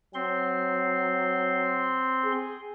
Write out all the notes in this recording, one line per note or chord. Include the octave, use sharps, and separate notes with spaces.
F#3 C4 C6
G#4